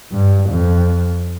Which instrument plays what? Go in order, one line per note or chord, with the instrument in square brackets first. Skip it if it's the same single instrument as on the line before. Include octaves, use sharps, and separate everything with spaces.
[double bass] G2
F2